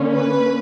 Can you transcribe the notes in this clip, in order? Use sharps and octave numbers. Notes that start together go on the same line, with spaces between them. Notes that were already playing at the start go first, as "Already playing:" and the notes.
Already playing: D3 A#3 C#4
B4